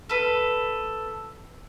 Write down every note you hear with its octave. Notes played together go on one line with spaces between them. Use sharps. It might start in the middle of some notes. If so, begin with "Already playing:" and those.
A4 B4